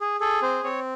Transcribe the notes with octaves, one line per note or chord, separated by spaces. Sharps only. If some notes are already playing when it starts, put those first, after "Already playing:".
G#4
G#4 A4
C4 C5
C4 C#5